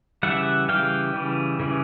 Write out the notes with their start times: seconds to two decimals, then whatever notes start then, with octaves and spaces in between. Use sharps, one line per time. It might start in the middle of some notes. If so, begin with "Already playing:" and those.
0.23 C#3 E3 G3 E5 F#5
0.69 C#3 E3 G3 F5 G5
1.14 C#3 E3 G3
1.59 C#3 E3 G3